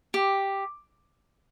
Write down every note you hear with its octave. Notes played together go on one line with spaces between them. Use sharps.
G4